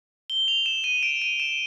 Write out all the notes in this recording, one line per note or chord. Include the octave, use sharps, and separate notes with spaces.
G7
F7
E7
D#7
D7
D#7
E7